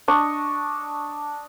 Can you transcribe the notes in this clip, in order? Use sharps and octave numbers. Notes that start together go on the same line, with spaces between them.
D4 D#5 C#6